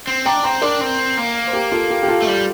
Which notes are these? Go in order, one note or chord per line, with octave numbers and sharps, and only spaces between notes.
C4
D4 G5 A#5
C4 G5 A#5
D4 A#4 D5
C4
A#3
C5
G4 A#4
F4 A4
G4
G4
F4 A4
A3
G3